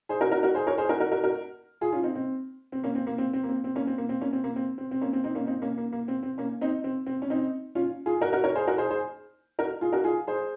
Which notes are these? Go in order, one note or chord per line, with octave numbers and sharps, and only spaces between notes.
G#4 C5
F#4 A#4
F#4 A#4
F#4 A#4
G#4 C5
A#4 C#5
G#4 C5
F#4 A#4
F#4 A#4
F#4 A#4
F#4 A#4
F4 G#4
C#4 F4
C4 D#4
C4
C4
A#3 C#4
C4
A#3
C4
C4
A#3
C4
C4
A#3 C#4
C4
A#3
C4
A#3 C#4
C4
A#3
C4
C4
C4
A#3 C#4
C4
C4 D#4
A#3 C#4
C4 D#4
A#3 C#4
A#3
A#3
C4
C4
A#3 C#4
C4 D#4
C4
C4
C#4
C4 D#4
C#4 F4
F4 G#4
F#4 A#4
F#4 A#4
A#4 C#5
G#4 C5
F#4 A#4
G#4 C5
G#4 C5
F#4 A#4
F4 G#4
F#4 A#4
F4 G#4
G#4 C5